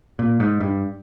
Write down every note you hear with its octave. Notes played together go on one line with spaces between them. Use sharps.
A#2
G#2
G2